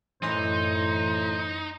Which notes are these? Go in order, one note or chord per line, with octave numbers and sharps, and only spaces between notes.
F#2 A2 E3 D#4 C5 C6